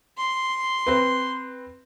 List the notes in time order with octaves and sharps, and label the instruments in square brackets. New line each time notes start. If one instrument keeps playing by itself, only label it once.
[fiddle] C6
[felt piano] C4 B4